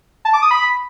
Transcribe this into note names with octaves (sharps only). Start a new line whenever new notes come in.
A5
D6
D#6
B5